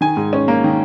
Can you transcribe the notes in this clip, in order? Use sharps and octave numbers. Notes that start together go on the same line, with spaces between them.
D#3 G#5
G#2
C#4
A#3
D#3